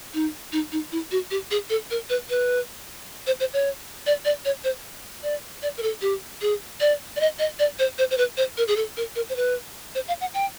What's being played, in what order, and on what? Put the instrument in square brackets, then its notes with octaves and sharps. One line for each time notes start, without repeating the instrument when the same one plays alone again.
[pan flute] D#4
D#4
D#4
E4
F#4
G4
G#4
A4
A#4
B4
B4
C5
C5
C#5
D5
D5
C#5
C5
D5
D5
A#4
A4
G4
G#4
D5
D5
D#5
D#5
D5
C5
C5
C5
B4
C5
A#4
G#4
A4
A#4
A#4
C5
B4
C5
F5
F#5
G5